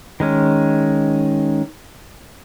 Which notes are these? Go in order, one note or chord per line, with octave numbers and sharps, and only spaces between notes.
D#3 G#3 C#4